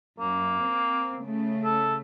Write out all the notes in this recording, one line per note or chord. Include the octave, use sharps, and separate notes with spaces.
F#2 A#3
C4
C#3 A3
A4